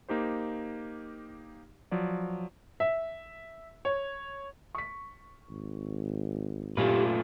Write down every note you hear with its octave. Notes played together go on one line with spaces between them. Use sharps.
A#3 D#4 G4 C5
F3 F#3 D5
E5
C#5
C#6 B6
G#1
F#2 A#2 A3 F4 G4 B4